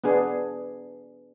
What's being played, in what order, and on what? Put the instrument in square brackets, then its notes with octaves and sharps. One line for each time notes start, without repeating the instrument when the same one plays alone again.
[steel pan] B3 D4 G#4